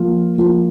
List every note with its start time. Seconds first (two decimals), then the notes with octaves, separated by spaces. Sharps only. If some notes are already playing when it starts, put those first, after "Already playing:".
Already playing: F3 A#3 F4
0.38 F3 A#3 F4